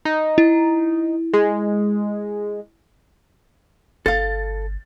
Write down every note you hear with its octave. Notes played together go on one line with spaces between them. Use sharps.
D#4
E4
G#3
G1 A4 F5 A6